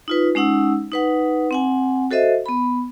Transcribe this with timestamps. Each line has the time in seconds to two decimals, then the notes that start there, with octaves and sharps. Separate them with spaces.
0.08 D#4 F4 B4
0.35 G#3 C#4 D#4 F#5 E6
0.92 D#4 B4 F#5
1.51 C4 F#5 G#5
2.11 F#4 A4 C5 D#5 E5
2.46 B3 B5